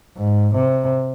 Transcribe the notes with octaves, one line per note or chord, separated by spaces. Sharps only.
G#2
C3